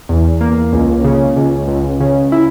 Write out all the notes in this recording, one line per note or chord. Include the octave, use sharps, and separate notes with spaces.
E2
A#3
C#2
C#3
C#2
C#2
C#3
E4